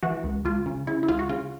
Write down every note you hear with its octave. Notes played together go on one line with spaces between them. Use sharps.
E3 F#4
C#2
C#2 F4
C#3
C#3 E4
E4
C#2 F4
F#4
C#3 F4